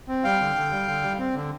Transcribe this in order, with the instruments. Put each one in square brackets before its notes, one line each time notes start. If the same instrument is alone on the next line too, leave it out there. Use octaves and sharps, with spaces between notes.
[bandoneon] C4
G3 F5 G5
D3
D3
G3
D3
G3
C4
D3